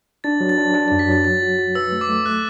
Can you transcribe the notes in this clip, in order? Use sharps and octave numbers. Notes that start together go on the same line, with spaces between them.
D4 A6
F#3
A6
D4
D4 A6
F#2 A6
B6
F#3 A6
F#3 A6
F#4
F#4
B4 E6
A3
D6
A3
A3 F#6